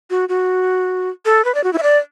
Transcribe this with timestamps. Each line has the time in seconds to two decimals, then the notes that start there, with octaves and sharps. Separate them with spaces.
0.10 F#4
0.29 F#4
1.25 A4
1.45 B4
1.55 D5
1.64 F#4
1.73 E4
1.78 E5
1.83 D5